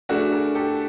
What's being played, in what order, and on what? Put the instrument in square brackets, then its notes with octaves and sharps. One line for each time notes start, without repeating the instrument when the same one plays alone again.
[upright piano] A3 D4 F#4 [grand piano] G#4 A#4
[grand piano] G#4 A#4
G4 A4